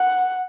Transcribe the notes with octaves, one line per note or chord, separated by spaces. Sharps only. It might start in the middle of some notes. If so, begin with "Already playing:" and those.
Already playing: F#5